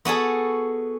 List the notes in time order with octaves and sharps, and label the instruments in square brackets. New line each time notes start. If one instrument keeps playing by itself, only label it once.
[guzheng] B3 F#4 G#4 A4